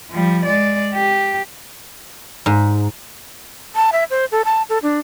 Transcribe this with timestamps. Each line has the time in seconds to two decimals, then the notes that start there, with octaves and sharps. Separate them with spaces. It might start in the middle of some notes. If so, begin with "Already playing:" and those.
0.11 F3 G3
0.45 G#3 D5
0.94 G4
2.46 G#2
3.75 A5
3.93 E5
4.10 C5
4.32 A4
4.45 A5
4.70 A4
4.83 D4